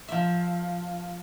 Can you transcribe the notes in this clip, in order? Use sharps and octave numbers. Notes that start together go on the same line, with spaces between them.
F3 E5